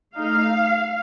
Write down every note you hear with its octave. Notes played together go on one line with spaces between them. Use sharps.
A3 D#4 F5